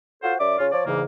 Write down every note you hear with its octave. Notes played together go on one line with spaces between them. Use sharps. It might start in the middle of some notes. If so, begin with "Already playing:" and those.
F4 F#4 A4 C5
F#2 D5 E5 D6
C#3 C#4 F4
F3 C#5 D5
E2 G#2 C#3 E3 A#3